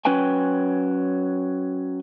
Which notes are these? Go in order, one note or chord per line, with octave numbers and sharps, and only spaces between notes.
F#3 C#4 B4 G5 G#5